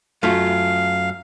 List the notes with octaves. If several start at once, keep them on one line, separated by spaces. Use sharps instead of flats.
F#2 A3 F4 F5